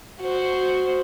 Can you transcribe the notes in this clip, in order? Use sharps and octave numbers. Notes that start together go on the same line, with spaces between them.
F#4 C5